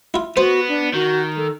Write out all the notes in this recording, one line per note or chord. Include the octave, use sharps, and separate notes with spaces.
E4 F4
B3 F#4 C5
D4
D#3 F#4
A4